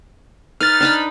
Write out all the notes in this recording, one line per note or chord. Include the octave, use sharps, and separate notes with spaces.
D#4 B4 F6 A6
D4 D#4 B5